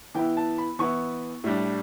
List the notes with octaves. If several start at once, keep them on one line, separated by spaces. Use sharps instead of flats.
E3 B3 E4 G5
A5
B5
E3 B3 E4 C#6
A2 G3 D4